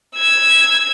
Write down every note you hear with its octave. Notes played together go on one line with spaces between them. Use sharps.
E6 G#6